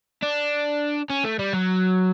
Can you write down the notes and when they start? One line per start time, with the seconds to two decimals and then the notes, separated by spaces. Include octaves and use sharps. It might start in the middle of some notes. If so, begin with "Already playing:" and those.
0.22 D4
1.10 C#4
1.24 A3
1.39 G3
1.53 F#3